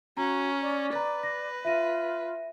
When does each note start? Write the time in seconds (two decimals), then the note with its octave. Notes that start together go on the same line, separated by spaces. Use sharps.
0.17 C#4 F#4 A#5
0.62 D5
0.93 B4 A#5 A6
1.23 A#6
1.65 F4 E5 A#6 D#7